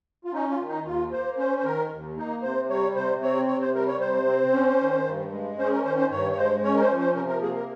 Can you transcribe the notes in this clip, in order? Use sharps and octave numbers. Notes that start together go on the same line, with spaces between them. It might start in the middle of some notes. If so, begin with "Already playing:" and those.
F4
C#4 D#4
F4
D#3
D#4
D#2 F4
A#3 C5
C#4 C5
C5
D#3 A#4
D#2
A#3 D#4
C3 C5
G3 C#5
C3 C5
C4 C#5
C3 C#5
C5
G3 A#4
C#5
C3 C5
C4
C#4
D#3
G2
G#3
C#4 C5
G#4
A#4
D#3 C5
C5
G2 C#5
C#5
G#3 C5
C#4 C#5
A#4
C5
F3
C5
C3 A#4
A#4
A#3 G#4
A#4